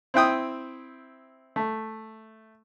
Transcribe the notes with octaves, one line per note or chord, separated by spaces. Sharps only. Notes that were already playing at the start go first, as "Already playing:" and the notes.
C4 E4 G5 D#6
A3